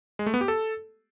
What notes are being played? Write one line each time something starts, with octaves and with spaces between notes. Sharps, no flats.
G#3
A3
B3
G4
A4